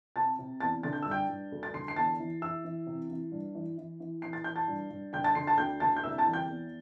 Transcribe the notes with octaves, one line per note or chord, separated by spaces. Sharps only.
C3 A5 A6
C3
E2 A5 A6
D3 A6
G6
G2 E6
G5 G6
G2
D2
A6
D3 C6 C7
C7
E2 A5 A6
E3
E3 E5 E6
E3
C3
E3
G2
E3
E3
E3
E3 C7
A6
E3 G6
A5 A6
G2
G2
D3 G5 G6
A5 A6
D3 C6 C7
A5 A6
D2 G5 G6
D3 A5 A6
G6
C2 E5 E6
A5 A6
E3
G5 G6
E2